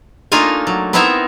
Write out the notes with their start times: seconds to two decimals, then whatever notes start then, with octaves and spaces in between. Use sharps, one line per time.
0.32 A3 A#3 D4 D#4 F4 G#5
0.67 F#3
0.93 B3 C4 D#4 E4 A#4 E5